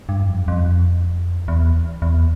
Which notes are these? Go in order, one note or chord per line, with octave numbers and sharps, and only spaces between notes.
G2
F2
F2
E2
E2